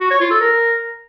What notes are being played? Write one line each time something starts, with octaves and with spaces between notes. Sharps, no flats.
F#4
C#5
F4
A4
A#4